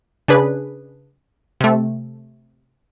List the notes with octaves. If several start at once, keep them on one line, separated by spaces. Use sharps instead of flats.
C#3 D4 G#4 B4
C3 A3